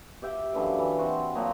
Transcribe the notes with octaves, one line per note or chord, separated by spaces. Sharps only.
G4 E5 G5
F#2 D3 E3 F5
E3
C4 F#4
A#2 F3 F#3